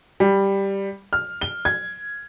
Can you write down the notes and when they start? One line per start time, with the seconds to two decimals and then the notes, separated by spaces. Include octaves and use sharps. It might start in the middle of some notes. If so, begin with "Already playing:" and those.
0.20 G3
1.13 F6
1.41 G7
1.65 G#6